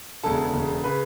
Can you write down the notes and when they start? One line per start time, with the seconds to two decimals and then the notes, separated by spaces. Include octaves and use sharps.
0.23 E1 E2 C#3 A4 A5
0.54 E1 E2 C#3
0.84 C#3 B4 B5